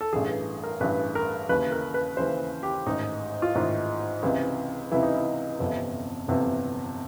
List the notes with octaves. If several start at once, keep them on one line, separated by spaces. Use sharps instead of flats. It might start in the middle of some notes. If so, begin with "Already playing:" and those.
A4
A1 G2 E3 G#4
A#4
A1 G2 E3 B4
A#4
D#2 C#3 E3 B4
A#4
B4
D#2 C#3 E3 C5
G4
A1 G#2 D#3 D#4
F4
A1 G#2 D#3 E4
C#2 C3 E3
C#2 C3 E3 E4
D#4
E4
G1 F2 C3 E3
G1 F2 C3 E3